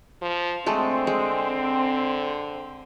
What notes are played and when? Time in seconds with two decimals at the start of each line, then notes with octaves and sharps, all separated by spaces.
0.22 F3
0.66 D3 G#3 A3 C4 A4
1.07 G#3